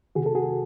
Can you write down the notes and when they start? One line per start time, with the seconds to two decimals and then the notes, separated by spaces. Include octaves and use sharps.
0.15 C3 D#3 F#4 G#4
0.26 A4
0.35 F#4 G#4